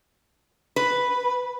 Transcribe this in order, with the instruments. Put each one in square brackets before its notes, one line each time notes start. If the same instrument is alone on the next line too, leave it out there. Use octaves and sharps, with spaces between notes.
[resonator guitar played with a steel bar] B4